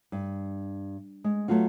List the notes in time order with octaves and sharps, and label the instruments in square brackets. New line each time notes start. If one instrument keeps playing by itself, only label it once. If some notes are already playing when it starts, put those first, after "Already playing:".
[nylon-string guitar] G2
G#3
F#3 A3 B3 F4 F#4